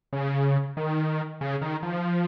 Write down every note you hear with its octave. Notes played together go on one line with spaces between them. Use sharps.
C#3
D#3
C#3
D#3
F3